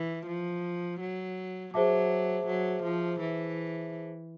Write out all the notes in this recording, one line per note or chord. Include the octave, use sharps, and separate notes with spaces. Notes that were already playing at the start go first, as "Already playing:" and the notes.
Already playing: E3
F3
F#3
F#3 G#4 C5 E5 A5 D6
F#3
F3
E3